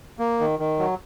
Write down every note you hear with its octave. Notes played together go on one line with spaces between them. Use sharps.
A#3
D#3
D#3
F#3